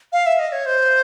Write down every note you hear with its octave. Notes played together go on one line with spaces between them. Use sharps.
F5
E5
D#5
C#5
C5